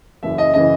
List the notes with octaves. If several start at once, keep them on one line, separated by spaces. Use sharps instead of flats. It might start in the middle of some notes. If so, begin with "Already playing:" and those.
F#1 F#2 C#3 E3 E5
D#5
C#3 E3 D#5